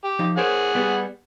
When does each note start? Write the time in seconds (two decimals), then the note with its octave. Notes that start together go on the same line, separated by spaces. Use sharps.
0.04 G4
0.19 F3 D#4
0.37 G#4 A#4 C5 C#5 F#5
0.75 G3 B3 G4